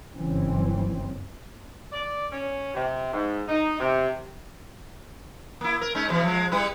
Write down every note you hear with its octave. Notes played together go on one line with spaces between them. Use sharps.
F#1 G2 E3 C4 C#4
D5
C#4
C3
G#2
D#4
C3
A#3 E4
A#4
G#3 C#4 D#4
B2 E3
F3 G#3
G3 E4 B4